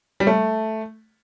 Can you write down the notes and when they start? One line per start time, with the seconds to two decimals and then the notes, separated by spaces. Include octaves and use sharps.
0.20 G3
0.27 A3